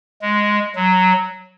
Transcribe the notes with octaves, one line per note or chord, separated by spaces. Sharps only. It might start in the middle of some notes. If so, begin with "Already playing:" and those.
G#3
F#3